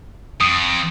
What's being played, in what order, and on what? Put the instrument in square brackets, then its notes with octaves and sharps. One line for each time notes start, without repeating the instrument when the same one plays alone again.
[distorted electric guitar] F2 [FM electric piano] D#6